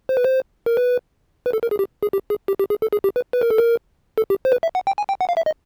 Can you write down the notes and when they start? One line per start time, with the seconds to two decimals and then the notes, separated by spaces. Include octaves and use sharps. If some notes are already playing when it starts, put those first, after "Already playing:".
0.09 C5
0.17 B4
0.24 C5
0.66 A#4
0.77 B4
1.46 B4
1.53 A4
1.63 A#4
1.71 G#4
1.79 G4
2.03 G#4
2.13 G4
2.30 G#4
2.48 G4
2.59 G4
2.70 G#4
2.82 A4
2.93 G#4
3.04 G4
3.16 B4
3.33 B4
3.41 A#4
3.50 A4
3.58 A#4
4.18 A4
4.30 G4
4.45 C5
4.52 B4
4.63 E5
4.75 F#5
4.87 G5
4.98 G#5
5.09 G5
5.21 F#5
5.29 F5
5.37 E5
5.46 D#5